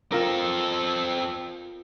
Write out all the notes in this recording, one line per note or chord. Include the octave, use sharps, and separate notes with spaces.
C4 F4 A4 A#4